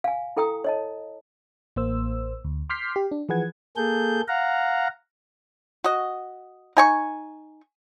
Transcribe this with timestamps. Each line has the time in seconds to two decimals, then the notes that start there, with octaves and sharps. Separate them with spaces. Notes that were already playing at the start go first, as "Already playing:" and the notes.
0.04 F5 G#5
0.37 E4 A4 G5 A#5 D#6
0.64 C#5 D#5 A5
1.76 A1 A#3 C5 E6
2.44 D2
2.70 C6 D6 F6 G6 B6 C7
2.96 G4
3.12 D4
3.29 E3 F3 G#4 B4 F#5 G#6
3.77 A#3 G#4 A4 G6
4.28 F5 F#5 A#5
5.84 F#4 D#5
6.77 D#4 G#5 C#6